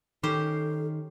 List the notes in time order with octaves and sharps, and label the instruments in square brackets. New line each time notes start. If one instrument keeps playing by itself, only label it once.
[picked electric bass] D#3 [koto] C#4 G4 C5 [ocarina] A4